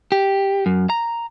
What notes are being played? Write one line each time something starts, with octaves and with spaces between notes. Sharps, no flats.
G4
F#2
A#5